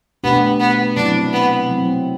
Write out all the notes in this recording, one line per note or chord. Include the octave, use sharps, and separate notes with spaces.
B2 A3 B3 D4 G4
B3
C3 F#3 C4 D4 E4
B3
C3 F#3 C4 E4